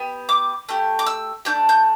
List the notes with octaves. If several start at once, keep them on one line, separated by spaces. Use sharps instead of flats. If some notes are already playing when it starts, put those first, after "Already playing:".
Already playing: B3 G4
D6
A3 G4
D6
E6
A3 D4 G4 G6
G6